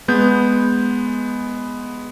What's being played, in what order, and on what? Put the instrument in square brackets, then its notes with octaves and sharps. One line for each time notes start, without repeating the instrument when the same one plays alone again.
[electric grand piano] G#3 B3 G6